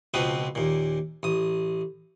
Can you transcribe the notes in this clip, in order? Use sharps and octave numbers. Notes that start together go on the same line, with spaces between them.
C#2 B2 F3 C4 B4 D#6
D#2 A#2
A1 D#6